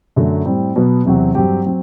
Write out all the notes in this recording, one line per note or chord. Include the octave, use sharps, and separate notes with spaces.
F#2 D3 F#3 A3
A2 G3 C4
B2 F#3 B3
E2 C3 F#3 C4 F#4
G2 F#3 C4 G4
F#3 C4